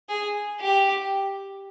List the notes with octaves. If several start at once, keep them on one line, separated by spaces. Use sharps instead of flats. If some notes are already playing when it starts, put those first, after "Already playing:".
G#4
G4